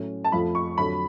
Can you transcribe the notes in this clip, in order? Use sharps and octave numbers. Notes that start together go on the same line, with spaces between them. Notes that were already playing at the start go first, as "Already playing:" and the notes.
Already playing: A2 F#3 C#4
A5
F2 F3 A3 B5
C#6
F2 D3 F#3 B5